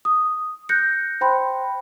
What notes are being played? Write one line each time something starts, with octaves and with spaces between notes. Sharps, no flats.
D#6
F#6 G6 A#6 C#7
C5 G5 B5 C6